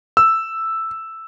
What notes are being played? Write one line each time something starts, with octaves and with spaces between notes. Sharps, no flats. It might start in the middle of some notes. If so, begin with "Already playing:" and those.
E6